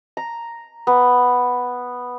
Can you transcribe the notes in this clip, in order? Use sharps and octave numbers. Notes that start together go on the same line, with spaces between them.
A#5
B3